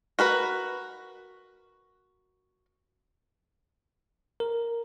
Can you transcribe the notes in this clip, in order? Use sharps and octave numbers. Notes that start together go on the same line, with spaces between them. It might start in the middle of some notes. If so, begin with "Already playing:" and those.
F#4 A#4 B4
A#4